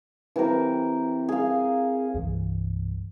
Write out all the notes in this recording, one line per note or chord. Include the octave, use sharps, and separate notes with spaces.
E3 C4 G4 A#4
G#4 F5
C2 G2 E3